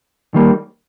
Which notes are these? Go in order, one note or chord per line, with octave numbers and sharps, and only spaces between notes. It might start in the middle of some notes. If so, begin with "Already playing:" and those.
D#3 G3 A#3